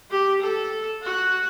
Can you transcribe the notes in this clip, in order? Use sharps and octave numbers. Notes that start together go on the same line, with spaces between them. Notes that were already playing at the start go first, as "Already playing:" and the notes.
G4
A4
F#4